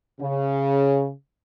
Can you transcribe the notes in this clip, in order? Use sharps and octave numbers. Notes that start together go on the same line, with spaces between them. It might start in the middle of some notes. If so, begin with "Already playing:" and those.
C#3